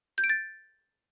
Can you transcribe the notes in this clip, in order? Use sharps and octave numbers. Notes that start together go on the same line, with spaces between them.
G6
D7
A6